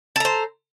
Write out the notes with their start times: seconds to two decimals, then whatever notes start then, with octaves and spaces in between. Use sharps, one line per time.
0.16 A4
0.20 A#5
0.25 C5